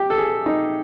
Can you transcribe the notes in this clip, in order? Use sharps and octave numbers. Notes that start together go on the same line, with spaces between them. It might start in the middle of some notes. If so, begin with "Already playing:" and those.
Already playing: G4
A4
G#4
D#4